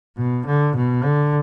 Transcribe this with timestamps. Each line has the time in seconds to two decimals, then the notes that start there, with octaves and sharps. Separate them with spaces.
0.17 B2
0.46 D3
0.75 B2
1.04 D3